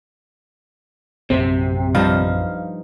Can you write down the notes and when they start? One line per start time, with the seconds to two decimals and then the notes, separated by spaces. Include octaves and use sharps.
1.30 A#1 F#2 C3 C4
1.95 G2 F3 D#4 F5